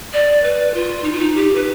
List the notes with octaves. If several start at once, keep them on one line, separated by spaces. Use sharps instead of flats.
D5
B4
F4
D#4
F4
D#4
G4
B4